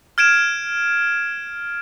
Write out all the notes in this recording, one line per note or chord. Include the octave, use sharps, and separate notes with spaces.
F6 G#6 D7 E7